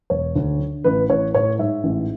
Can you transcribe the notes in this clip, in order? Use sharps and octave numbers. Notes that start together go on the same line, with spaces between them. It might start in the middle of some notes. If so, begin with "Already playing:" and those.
E1 C#5
D2
D3
A1 B4
A1 C#5
A2 C#5
G#2 E5
A1